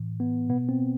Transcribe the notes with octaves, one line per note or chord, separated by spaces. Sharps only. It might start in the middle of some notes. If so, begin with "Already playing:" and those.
Already playing: A2 E3
B3
B2 B3
C4